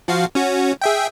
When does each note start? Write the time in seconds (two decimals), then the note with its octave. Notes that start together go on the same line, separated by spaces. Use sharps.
0.08 F3 F#4 F5
0.35 C#4 F#4
0.82 G#4 E5 G5